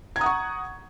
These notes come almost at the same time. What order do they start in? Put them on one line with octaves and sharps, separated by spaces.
G#6 A#5 D#6 F#5 C#6